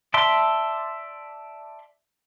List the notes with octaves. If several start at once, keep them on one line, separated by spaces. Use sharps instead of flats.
D5 E5 A5 C6